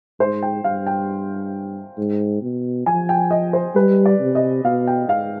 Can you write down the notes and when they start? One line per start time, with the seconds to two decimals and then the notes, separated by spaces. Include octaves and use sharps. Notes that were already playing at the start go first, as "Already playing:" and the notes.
0.20 G#2 C5
0.43 G5
0.64 G2 F5
0.87 G5
1.98 G#2
2.42 B2
2.86 F3 G#5
3.09 G5
3.31 D#5
3.53 C5
3.75 G3 B4
4.06 D5
4.21 C3
4.35 D#5
4.65 B2 F5
4.87 G5
5.08 G#2 F5